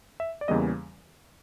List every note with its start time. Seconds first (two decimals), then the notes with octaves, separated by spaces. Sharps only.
0.20 E5
0.41 D5
0.48 E2 C#3 E3 G3 A#3 D#5